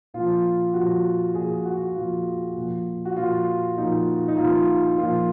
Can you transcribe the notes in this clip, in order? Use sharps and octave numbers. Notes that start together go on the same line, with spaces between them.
A#2 F3 F4
A#2 F3 F#4
A#2 F3 G#4
F#4
A#2 F3 F4
A#2 F3
F#4
A#2 F3 F4
A#2 F3 D#4
D#4
A#2 F3 F4
A#2 F3 F4